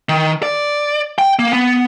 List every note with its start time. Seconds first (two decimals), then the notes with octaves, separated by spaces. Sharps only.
0.09 D#3
0.43 D5
1.19 G5
1.39 A#3
1.53 B3